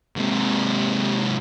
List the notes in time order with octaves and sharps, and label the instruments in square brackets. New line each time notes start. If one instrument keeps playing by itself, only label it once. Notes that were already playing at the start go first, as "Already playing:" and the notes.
[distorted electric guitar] G#2 C3